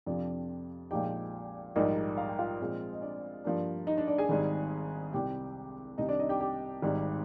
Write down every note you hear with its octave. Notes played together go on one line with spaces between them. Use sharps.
F2 C3 F3 D4 D5
A#1 A#2 F3 G#3 D#4 G4 G5
A#1 G#2 G3 A#3 D#4
F5
G5
F4 F5
A#1 A#2 G#3 C4
D#5
D4 D5
G2 F3 A#3 D4
D#4 D#5
D4 D5
D4 D5
G#4 G#5
G#1 G#2 G3
C2 C3 G3 G4 G5
C2 C3 D#3 D#4 D#5
D4 D5
D#4 D#5
G4 G5
G4 G5
G#1 G#2 G3